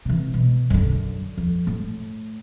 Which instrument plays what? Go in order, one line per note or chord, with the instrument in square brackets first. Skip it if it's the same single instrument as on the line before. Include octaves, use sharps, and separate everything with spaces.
[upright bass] C3 E3
B2
F#2 D3
F2
A2